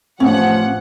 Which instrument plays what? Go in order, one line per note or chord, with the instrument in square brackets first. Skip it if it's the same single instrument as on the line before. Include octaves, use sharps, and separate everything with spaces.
[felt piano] A1 [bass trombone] F3 [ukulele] C#4 [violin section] F#5